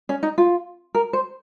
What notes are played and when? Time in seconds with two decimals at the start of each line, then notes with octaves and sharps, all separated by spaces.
0.09 C#4
0.23 D#4
0.38 F4
0.94 A#4
1.13 C5